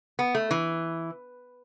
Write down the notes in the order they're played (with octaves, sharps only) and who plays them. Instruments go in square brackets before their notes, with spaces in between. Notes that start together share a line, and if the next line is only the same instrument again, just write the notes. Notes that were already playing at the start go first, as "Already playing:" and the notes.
[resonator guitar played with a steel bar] B3
A3
E3